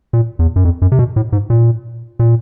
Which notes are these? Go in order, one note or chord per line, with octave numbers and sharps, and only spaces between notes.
A#2
E2
F#2
F2
F#2
C3
B2
A2
G#2
A#2
A#2